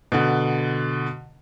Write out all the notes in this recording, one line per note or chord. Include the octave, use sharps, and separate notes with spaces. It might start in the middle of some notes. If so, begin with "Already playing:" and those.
B2 D3